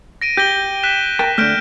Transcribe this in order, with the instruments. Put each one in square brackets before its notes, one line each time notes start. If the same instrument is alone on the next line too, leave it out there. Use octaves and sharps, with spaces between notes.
[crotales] A#6 D7 D#7
[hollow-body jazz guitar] G4 [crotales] G6 A#6 G7
[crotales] F#6 B6 E7
[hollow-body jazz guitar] A#4 G5 A5
[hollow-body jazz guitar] D3 A3 [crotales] F6 G6 D7